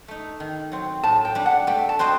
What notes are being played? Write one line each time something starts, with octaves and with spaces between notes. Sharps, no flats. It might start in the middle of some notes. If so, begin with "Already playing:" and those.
A3 D#4
D#3
F#3 C4
A2 A5
G5
G3 D4
F#5
A3 G5
A5
C4 F#4 C5 D#5